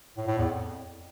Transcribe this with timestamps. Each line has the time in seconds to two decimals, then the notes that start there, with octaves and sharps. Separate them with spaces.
0.17 A2
0.28 A2
0.38 E2
0.48 F2